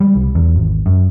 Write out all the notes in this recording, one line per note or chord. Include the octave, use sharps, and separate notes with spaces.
G3
C2
E2
G#1
F#2